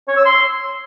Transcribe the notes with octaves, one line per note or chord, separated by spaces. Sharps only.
C#5
E6
C6